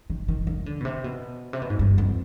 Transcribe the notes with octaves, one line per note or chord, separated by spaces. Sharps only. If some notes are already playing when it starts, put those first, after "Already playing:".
D#3
D#3
D#3
D3
B2
C3
B2
C3
B2
G#2
G2
F2